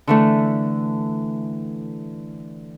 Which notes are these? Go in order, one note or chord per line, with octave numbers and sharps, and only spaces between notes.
D3 E3 A3